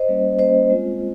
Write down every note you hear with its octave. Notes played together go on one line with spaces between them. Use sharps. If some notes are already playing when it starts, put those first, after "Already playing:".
Already playing: C5 D#5
G3 A#3 C#4
G3 A#3 C#4 C5 D#5
G#3 C4 F4